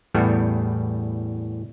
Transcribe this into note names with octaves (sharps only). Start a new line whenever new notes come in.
E2 A2 G3 B3